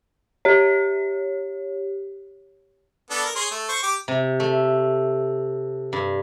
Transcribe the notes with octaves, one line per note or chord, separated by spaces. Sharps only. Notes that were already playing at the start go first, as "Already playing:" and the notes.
G4 C#5
B3 D4 A4
A#4
G#4 C#5 C6
A3
C5 C#6
G4 D6
C3
A3
G2